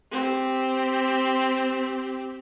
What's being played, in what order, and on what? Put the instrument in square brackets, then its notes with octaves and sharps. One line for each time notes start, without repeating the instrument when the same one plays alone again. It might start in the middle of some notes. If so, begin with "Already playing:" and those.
[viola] C4 G4